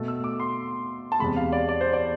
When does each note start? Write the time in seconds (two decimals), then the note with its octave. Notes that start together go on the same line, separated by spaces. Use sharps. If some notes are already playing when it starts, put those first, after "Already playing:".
Already playing: B2 A3
0.08 E6
0.24 D6
0.40 C6
1.12 A5
1.19 E2 C3 G#3 B5
1.36 F5
1.52 D5
1.69 D5
1.81 C5
1.93 D5